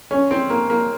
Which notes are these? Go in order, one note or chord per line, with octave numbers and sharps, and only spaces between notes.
C#4
C4
A#3
A#3